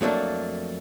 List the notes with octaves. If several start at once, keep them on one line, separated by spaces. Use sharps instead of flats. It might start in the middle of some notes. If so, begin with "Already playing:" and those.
F2 F#3 A3 A#3 D4